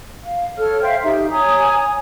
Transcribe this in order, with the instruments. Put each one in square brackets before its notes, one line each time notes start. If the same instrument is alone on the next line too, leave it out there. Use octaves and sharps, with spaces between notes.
[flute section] F5
A4 C#5 F6
C5 E5 F5 G5
D#4 G4 E5
C#5 G#5 A#5 D#6